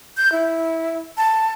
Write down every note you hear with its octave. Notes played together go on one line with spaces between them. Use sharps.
G6
E4
A5